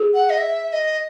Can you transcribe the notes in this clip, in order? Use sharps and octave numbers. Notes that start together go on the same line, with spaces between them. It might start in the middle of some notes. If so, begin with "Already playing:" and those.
Already playing: G#4
F#5
D#5
E5
E5
D#5